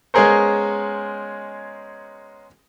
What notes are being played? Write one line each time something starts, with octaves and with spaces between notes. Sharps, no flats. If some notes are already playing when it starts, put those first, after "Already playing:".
G#3 B3 C#4 G#4 A#4 C5